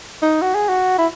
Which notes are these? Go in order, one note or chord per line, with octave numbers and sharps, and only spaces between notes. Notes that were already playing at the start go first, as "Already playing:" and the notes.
D#4
F#4
G#4
F#4
E4